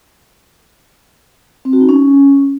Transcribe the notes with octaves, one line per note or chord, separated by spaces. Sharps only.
C4
F#4
D#4
C#4